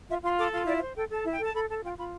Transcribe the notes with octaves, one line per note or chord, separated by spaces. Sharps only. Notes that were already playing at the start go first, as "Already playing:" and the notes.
F4 E5
F4 C6
A4 D6
F4 C6
E4 D5
E5
C5
A4 G5
A4 A5
E4
G5
A4 A5
A4 B5
A4 A5
F4 G5
F4 B5